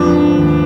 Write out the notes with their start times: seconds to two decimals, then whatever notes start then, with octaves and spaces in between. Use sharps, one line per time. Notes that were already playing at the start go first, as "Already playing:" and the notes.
Already playing: F2 F3 D4 B4
0.14 G#2
0.35 D#2